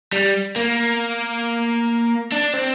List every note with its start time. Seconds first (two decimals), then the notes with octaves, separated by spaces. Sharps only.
0.13 G3
0.56 A#3
2.32 D4
2.53 C4